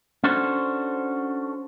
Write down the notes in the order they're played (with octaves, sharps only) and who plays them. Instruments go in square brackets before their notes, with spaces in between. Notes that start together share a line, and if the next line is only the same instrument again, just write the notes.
[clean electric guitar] C#4 D4 F#4 A4 C5